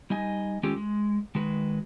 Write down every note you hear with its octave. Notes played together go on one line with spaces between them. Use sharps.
G3 D#4 D#5 G#5
D#3 G#3 C#4 F4 G4 A4
G#3
D#3 G#3 F#4 B4